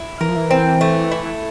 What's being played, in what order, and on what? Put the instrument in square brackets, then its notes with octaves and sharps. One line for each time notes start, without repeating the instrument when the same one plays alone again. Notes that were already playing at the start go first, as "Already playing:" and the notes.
Already playing: [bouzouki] E4
[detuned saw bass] E3 [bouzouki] A#4
[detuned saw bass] F3
E3
[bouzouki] C4
A3
E4